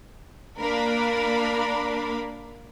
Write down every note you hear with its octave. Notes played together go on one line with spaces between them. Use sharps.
A#3 D4 A#4 B5